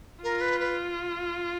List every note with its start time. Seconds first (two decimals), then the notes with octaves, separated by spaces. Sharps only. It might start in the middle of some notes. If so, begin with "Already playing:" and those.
0.23 F4 A#4
0.41 B4
0.60 B4